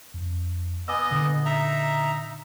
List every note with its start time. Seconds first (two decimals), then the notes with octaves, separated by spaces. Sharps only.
0.14 F2
0.88 B3 D#5 G#5 D6 E6
1.11 A#2 D3
1.45 D#4 E5 A#5